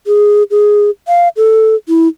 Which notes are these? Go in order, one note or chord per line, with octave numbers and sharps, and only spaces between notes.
G#4
G#4
F5
A4
E4